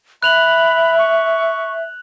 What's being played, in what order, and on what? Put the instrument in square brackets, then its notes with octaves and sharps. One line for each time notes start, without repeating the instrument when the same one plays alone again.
[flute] E5 [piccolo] B5 [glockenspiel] F#6 F7 F#7
[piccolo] C#6